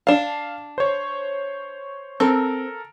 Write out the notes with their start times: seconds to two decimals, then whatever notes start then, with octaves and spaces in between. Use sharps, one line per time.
0.07 D4 F5 A5 E7
0.78 C5 C#5
2.20 C4 A4 A#4